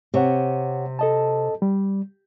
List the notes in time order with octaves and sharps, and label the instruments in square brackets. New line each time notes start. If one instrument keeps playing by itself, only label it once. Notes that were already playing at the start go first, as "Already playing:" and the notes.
[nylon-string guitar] C3 [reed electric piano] G4 C#5 F#5
[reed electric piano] A4 D#5 A5
G3